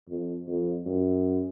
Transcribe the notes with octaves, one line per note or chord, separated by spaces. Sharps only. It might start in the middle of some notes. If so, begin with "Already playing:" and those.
F2
F2
F#2